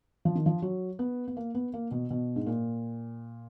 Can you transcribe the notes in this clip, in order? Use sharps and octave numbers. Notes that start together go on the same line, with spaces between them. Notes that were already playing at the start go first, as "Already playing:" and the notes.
F3
D#3
F3
F#3
B3
B3
A#3
B3
A#3
B2
B2
G#2
A#2